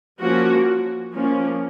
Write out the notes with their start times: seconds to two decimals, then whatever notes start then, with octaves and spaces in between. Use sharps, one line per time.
0.21 F3 A#3 C#4 F#4
1.13 F3 A#3 C#4